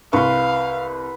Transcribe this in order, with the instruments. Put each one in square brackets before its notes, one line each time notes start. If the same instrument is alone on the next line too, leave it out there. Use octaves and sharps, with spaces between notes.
[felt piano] C2 C#6 [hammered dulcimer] B4 C6 [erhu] F5